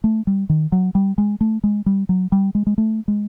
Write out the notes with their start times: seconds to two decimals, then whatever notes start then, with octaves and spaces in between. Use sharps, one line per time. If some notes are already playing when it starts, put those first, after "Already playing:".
0.04 A3
0.27 G3
0.49 D#3
0.72 F#3
0.95 G3
1.18 G#3
1.41 A3
1.64 G#3
1.86 G3
2.09 F#3
2.32 G3
2.55 G#3
2.67 G#3
2.78 A3
3.08 G#3